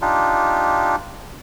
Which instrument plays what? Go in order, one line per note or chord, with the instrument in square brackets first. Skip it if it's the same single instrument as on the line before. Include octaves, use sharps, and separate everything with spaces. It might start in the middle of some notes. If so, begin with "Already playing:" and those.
[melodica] D4 D#4 F4 G4